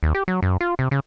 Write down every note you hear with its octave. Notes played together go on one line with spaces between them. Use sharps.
D#2
G4
F#3
F#2
F4
C3
C#3